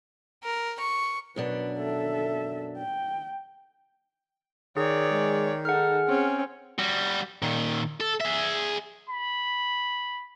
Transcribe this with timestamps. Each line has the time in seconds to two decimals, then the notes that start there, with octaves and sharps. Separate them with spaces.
0.43 A#4
0.80 C#6
1.36 F#2 B2 D4 B4
1.79 A4 E5
2.77 G5
4.77 D#3 G#4 C#5 D5
5.11 G#3
5.65 D#4 G#4 A4 F#5 F6
6.08 C4 C#4
6.79 G3 F#4
7.42 A#2 D#3
8.01 A4
8.21 G#4 E5
9.10 B5